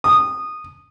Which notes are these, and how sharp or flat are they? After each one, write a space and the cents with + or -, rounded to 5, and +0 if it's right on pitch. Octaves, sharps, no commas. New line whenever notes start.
D#6 -15